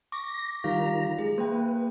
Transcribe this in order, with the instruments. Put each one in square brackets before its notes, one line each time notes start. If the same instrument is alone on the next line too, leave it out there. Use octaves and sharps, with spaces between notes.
[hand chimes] C#6 D6 [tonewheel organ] A#6
[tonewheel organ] D#3 G3 A#5 [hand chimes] F4 F5
[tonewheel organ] G#3 [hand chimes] G#4
[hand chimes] A#3 G5 [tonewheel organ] B4